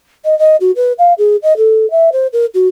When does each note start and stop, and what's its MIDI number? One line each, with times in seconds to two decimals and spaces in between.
0.25 0.37 75
0.39 0.56 75
0.61 0.71 66
0.76 0.93 71
0.99 1.13 77
1.18 1.36 68
1.43 1.57 75
1.57 1.89 69
1.91 2.10 76
2.12 2.27 72
2.33 2.46 70
2.54 2.68 66